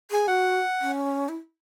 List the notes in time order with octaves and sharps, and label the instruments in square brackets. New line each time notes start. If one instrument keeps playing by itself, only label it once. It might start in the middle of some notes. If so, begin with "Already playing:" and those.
[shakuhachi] G#4 [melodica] G#5
[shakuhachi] F#4 [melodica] F#5
[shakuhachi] C#4
E4